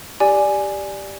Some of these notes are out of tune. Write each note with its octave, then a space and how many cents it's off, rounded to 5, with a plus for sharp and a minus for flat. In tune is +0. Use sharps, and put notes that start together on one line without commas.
G4 +0 D5 +0 G#5 +0